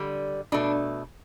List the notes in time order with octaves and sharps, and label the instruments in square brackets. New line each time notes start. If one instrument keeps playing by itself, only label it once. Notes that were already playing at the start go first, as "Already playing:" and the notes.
Already playing: [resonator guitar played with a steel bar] D3 G3
B2 A3 D4